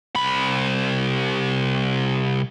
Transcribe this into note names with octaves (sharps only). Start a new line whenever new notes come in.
C2 B5